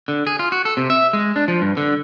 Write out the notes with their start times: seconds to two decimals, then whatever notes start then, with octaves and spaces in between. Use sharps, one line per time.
0.08 D3
0.27 G#4
0.39 F4
0.52 F#4
0.65 A4
0.77 C3
0.90 E5
1.13 G#3
1.36 D4
1.48 F3
1.61 G2
1.77 D3